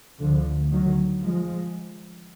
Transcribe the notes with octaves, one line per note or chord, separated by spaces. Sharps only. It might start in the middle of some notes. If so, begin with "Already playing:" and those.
D2 D3 F3
D#3 F#3
F3 G#3